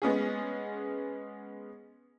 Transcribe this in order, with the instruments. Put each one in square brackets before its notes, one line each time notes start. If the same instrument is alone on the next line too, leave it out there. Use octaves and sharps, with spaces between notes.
[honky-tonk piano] G#3 B3 C#4 G#4